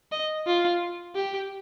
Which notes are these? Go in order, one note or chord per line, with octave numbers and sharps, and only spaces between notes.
D#5
F4
G4